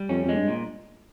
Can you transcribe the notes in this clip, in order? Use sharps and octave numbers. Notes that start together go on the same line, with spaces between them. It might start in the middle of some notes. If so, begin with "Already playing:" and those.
Already playing: G3
F2 C#4
F2 G#3
G2
A#2